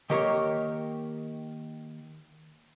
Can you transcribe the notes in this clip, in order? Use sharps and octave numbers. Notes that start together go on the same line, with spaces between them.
D#3 A#3 G4 A#4 C5 C#5